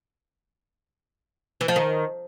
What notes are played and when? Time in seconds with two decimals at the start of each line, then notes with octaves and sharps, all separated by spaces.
1.61 E3
1.68 F3
1.76 D#3